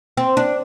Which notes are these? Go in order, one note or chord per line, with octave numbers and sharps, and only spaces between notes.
C4
D4